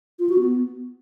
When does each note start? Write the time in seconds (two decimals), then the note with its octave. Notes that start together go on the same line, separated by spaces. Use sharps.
0.19 F4
0.29 F#4
0.39 B3